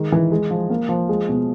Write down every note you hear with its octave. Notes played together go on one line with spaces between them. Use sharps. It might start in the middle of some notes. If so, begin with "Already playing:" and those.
Already playing: D#3 G#3
E3
G#3
F3
A#3
F3
G#3
B2